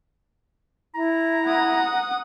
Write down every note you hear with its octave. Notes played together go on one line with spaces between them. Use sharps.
E4 A#5
F#5 D#6